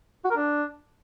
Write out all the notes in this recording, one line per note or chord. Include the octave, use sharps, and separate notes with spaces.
F#4
A#4
D4